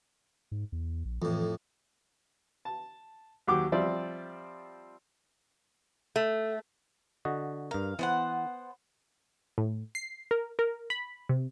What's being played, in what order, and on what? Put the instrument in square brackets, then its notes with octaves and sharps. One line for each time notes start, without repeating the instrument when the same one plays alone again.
[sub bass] G#2
E2
A#1
[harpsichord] F2 A2 [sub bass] E3
[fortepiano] A5
D#2 F#3 F#4 G4 D6
F3 G3 C4 D5 E5
[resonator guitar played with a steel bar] A3
[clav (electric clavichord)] D3 F#4 D#5
[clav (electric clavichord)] G2 A#4 [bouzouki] F5
[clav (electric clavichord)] E3 [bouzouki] B3 C5 F#5
[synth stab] A2
C7
A#4
A#4
B5
C3